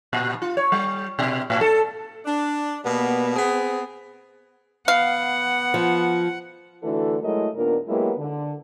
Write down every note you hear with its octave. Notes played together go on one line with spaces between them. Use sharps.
A#2
F4
C#5
G3
B2
A2
A4
D4
B2 G3 A#3 B3
B3 C4 G#4
B3 F5 F#5
F3
D3 E3 A3 F#4 A4
F#3 G#3 A3 E4 A#4 D#5
D#2 A#2 B3 D4 A#4
F#3 G#3 A#3 B3 E4 G4
D3